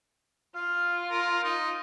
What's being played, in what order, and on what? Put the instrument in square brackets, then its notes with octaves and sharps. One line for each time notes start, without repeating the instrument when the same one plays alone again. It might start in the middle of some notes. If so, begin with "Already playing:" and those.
[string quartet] F4 [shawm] F5
[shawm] A#4
D#4